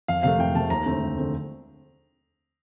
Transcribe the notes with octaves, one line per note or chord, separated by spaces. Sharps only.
F2 F5
C3 F3 A3 F5
F2 G5
C3 F3 A3 A5
D#2 A#5
D3 A3 C4
D#2
D3 A3 C4